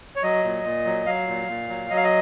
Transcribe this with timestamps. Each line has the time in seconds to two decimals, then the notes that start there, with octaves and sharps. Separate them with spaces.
0.16 C#5
0.23 F#3 D#5
0.44 A#2
0.64 A#2
0.85 F#3
1.06 F#3 F5
1.27 A#2
1.48 A#2
1.68 F#3
1.90 F#3 D#5
1.97 F5
2.04 D#5